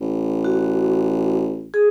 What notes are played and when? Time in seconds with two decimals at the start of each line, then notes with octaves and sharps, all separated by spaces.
0.01 A1
0.44 F#4
1.74 G#4